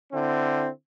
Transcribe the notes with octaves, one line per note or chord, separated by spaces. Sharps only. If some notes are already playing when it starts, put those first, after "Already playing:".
D3 C4 E4